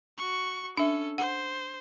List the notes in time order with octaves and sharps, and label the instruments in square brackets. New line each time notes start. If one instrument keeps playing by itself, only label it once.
[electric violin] F#4 C#6
[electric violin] C#4 A4 [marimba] D4 E5
[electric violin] C5 [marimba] F#5